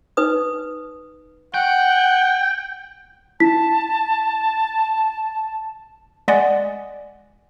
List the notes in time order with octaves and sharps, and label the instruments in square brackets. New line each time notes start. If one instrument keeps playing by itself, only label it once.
[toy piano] D#4 B4 D#6
[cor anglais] F#5 [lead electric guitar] G5
[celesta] E4 B6 [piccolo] A5
[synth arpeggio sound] G#3 D5 D#5 F#5 G#5